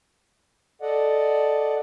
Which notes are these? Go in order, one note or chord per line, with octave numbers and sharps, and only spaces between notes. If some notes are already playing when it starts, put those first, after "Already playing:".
A4 D5 D#5 F#5